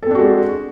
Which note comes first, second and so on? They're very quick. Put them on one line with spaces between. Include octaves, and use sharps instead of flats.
A4 C4 D4 F#4 G#3